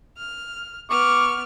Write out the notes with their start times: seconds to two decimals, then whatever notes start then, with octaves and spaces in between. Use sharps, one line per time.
0.18 F6
0.90 B3 C#6 D6 F6